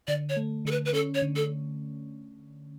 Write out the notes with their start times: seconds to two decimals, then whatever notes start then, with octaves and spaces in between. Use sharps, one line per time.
0.08 D3 D5
0.29 C#5
0.37 A3
0.65 D3 A4
0.71 B4
0.85 B4
0.93 C#4 A4
1.15 C#5
1.22 D3
1.36 A4